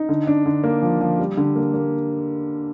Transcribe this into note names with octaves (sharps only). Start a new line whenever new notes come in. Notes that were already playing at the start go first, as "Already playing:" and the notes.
Already playing: D#4
D3
D4
D3
A#3
F3
F3
G3
D3
A#3
A#3